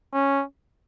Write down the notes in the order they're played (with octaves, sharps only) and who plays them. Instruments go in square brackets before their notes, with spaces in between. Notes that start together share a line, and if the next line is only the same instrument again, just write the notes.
[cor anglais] C#4